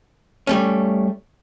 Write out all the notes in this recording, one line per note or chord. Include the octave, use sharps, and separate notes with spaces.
G3 A3 C#4